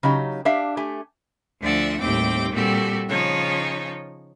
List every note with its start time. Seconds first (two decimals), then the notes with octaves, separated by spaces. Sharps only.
0.03 C#3 F#3 D#4 G4
0.45 D4 G4 E5 F5
0.77 A3 G4 G#5
1.62 D2 F3 D5 E5 F#5
1.99 D#2 A2 G3 C4 G5 D6
2.52 A#2 G3 C4 F#4 G4 A4
3.08 C#3 F3 D#4 C#5